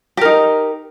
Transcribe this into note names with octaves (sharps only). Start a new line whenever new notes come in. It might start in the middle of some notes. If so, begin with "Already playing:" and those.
D#4 G4 A#4